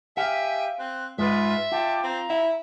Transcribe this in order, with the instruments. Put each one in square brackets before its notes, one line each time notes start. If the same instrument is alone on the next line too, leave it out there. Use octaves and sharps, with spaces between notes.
[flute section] G4 G#5 [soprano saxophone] E5 [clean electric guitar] F5
[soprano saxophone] C4 [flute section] F#6
[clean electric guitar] G#2 G#3 [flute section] F4 B4 [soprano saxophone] E5
[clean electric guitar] F4 [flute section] G5 A5 D6
[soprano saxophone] C4 [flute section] A#5
[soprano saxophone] E4 [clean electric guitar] E5